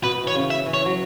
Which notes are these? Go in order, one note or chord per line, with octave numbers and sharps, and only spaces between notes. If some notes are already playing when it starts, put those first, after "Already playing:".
B2 B4
E3 C#5
C#3
E5
E3
C#5
F#3